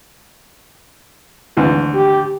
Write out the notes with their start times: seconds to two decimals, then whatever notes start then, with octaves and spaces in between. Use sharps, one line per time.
1.57 G#1 D2 E3
1.95 G4